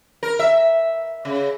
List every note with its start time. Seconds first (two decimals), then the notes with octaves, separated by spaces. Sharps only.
0.23 A#4
0.39 E5
1.25 C#3